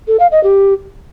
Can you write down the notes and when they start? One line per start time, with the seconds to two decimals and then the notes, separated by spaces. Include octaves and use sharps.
0.08 A4
0.20 F5
0.32 D#5
0.44 G4